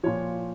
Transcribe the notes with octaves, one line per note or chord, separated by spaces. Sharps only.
A#2 F3 C#5